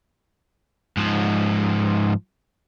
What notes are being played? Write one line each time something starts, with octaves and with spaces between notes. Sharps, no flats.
G#2 F3